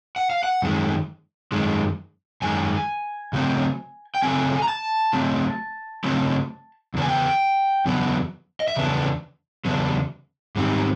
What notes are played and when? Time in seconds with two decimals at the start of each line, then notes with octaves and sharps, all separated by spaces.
0.16 F#5
0.30 F5
0.43 F#5
0.62 F#2 D#3 G#3
1.52 F#2 D#3 G#3
2.42 F#2 D#3 G#3 G#5
3.33 C#3 F#3 A3 C4
4.15 G5
4.23 C#3 F#3 A3 C4 G#5
4.62 A#5
4.68 A5
5.13 C#3 F#3 A3 C4
6.04 C#3 F#3 A3 C4
6.94 E2 C#3 B3 D4
7.01 G#5
7.09 G5
7.85 E2 C#3 F#3 B3 D4
8.60 D#5
8.68 E5
8.75 E2 C#3 B3 D4
9.65 E2 C#3 F#3 B3 D4
10.56 G#2 D#3 G3 C4